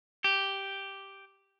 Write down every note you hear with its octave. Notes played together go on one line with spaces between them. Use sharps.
G4